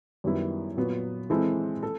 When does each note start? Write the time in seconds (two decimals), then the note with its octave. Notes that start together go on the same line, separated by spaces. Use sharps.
0.24 F#2 D#3 G3 B3 E4
0.77 A#2 F#3 B3
1.30 E3 G#3 C4 E4 A4
1.83 A4